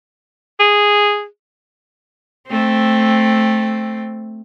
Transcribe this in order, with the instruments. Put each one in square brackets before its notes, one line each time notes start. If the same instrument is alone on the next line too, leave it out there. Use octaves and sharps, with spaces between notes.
[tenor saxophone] G#4
[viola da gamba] A3 C4